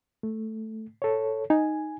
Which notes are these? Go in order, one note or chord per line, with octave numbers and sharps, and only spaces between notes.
A3
A4 C#5
D#4 G#5